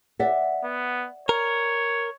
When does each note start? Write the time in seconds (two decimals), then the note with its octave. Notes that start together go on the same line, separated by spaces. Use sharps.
0.19 D5 E5 F#5
0.64 B3
1.29 A#4 C#5